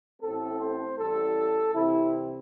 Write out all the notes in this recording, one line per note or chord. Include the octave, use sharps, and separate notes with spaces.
A1 A2 A3 C4 A4
C5
A1 A2 E3 G3 A4
C2 C3 E3 C4 E4